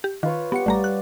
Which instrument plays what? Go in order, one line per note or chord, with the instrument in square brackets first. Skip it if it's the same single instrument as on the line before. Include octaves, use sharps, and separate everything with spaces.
[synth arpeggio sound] G4
[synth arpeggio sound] D#3 [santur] F4 B4 C#5
[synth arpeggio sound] B3 C#7 [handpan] G4 F#5
[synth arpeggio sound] A1 A3 A#5 [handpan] G3 D5
[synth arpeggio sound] F#6